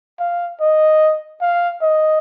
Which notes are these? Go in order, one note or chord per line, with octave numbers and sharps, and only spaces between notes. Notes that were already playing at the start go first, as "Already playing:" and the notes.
F5
D#5
F5
D#5